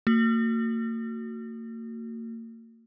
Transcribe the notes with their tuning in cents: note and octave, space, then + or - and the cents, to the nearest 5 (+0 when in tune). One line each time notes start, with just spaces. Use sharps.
A#3 -40 F#4 -5